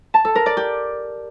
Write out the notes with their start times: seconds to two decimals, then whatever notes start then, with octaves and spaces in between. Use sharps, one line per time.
0.14 A5
0.25 A4
0.35 A#4
0.46 D5
0.57 G4